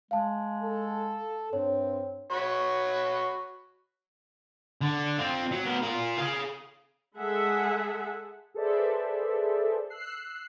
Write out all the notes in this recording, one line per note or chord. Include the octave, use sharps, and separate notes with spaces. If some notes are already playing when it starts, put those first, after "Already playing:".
G#3 F5 A5
A4
G2 C4 C#5
F#4 C#5 B5
D3
C4 F4
F#3
B3 A#4
F4 A#4
G#4 F5
G#3 G#4 A4 E5 F#5
G#4 A4 B4 C5 D5 E5
E6 F#6 C7